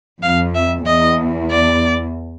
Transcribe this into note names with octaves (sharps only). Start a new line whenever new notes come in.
F2 F5
E5
E2 D#5
D5